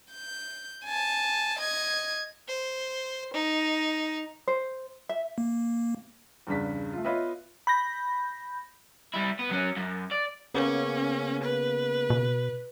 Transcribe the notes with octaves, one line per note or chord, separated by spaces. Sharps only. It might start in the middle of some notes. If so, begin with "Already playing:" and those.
G6
G#5 A5
D#5 G#6
C5
D#4
C5
E5
A#3
E2 G2 C#3 D4 B6
A3 F4
B3 F4 B4 C#5 D#5 E5
B5 G6 A#6
G3 E4
B3
F#3 C#4
F#2
D5
C#3 A#3 B3 C#4
B4
B2